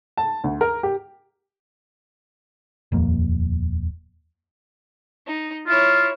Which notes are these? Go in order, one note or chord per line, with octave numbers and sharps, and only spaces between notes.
A5
D2
A#4
G4
D#1 F2 A#3
D#4
E4 F4 C#5